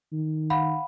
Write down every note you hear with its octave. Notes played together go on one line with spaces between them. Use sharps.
D#3
F5 F#5 B5